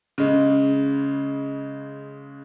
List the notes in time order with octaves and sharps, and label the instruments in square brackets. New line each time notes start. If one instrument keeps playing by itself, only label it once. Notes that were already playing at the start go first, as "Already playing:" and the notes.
[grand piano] C#3 G#3